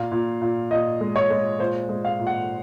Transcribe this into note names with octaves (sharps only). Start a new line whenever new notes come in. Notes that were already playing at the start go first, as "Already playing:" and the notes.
Already playing: A#2 F5
A#2
A#2
A#2 D#5
G#3
C#5
G#3
A#2 C5
G#3
F5
A#2
F#5